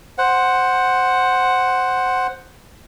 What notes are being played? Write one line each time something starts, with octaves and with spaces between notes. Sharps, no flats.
C5 F#5